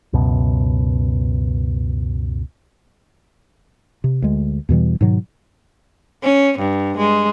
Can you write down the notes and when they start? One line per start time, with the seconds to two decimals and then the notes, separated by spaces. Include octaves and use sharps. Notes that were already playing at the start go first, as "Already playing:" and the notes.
0.13 C#2 F#2 B2
4.04 C3
4.22 D2 G#3
4.69 E2 B2 E3 G3
5.01 G#2 B2 D#3 F#3
6.23 C#4
6.59 G2
6.98 G#3